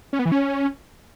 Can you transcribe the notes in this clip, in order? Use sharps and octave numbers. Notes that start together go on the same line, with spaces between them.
C#4
B3
E3
C#4